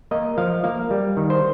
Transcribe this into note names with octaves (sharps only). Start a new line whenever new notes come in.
A#3 D#5
F3 F5
A#3 F5
G3
D#3
C5